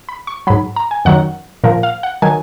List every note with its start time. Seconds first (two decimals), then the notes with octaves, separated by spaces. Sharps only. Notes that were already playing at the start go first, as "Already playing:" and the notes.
0.09 B5
0.27 C#6
0.47 G#2 F#3 B5
0.76 A#5
0.91 G#5
1.05 F#2 D#3 F#3 F#5
1.64 A#2 F3 A#4
1.83 F5
2.03 F#5
2.22 D#3 F#3 G#5